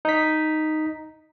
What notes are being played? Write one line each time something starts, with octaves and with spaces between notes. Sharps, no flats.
D#4 B6